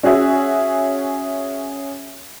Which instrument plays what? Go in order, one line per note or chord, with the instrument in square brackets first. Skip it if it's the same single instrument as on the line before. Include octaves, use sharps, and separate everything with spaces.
[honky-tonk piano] C#4 F#4 G#4 E5